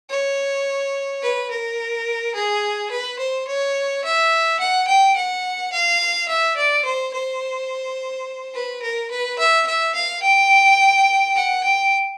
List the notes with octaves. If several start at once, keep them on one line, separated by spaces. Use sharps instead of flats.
C#5
B4
A#4
G#4
B4
C5
C#5
E5
F#5
G5
F#5
F5
E5
D5
C5
C5
B4
A#4
B4
E5
E5
F5
G5
F#5
G5